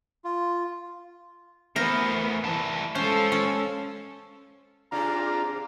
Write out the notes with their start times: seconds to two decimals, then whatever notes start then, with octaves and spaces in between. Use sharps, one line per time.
0.25 F4
1.76 E3 A3 B3 A#4 C5
2.44 C2 E3 A5
2.95 G#3 C#4 A4 C5 F5
3.32 C#4
4.92 G#2 C3 D4 F4 G#4 A#5